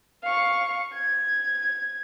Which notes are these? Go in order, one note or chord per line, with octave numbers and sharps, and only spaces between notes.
F5 C#6
G#6